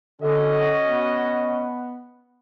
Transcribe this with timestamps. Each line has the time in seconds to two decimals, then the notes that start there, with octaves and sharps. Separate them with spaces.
0.22 D3 C#4 F#4 D#5
0.87 B3